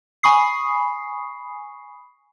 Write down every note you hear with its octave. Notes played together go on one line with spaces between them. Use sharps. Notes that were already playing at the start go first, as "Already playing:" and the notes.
G#5 B5 C#6 D#6 C7